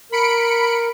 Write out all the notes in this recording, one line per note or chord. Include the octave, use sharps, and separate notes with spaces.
A#4 B5 C#7 D7